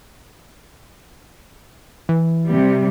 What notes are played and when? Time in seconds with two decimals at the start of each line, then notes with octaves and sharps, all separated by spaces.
2.09 E3
2.46 C3 G3